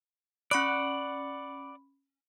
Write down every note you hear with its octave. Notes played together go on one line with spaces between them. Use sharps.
C#4 D5 F#5 B5 C#6 F#6